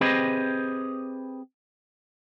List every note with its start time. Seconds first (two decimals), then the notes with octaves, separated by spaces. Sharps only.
0.01 C4 G4 G#4 B4 C5 D#5